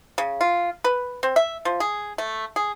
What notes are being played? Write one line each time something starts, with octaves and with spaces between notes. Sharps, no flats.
C#3
F4
B4
C4
E5
F3
G#4
A3
G#4